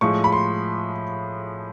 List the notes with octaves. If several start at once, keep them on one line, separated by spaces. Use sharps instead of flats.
A2 F3 G#3 C#6
B5
C6